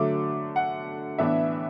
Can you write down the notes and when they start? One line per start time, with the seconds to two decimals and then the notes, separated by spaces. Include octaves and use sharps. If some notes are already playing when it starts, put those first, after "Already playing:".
Already playing: D3 F#3 A3 D6
0.56 F#5
1.18 A2 E3 B3 D4 E5